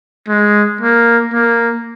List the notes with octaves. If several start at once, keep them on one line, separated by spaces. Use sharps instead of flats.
G#3
A#3
A#3